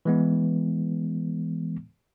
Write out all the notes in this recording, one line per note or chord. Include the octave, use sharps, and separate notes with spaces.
E3 G#3 B3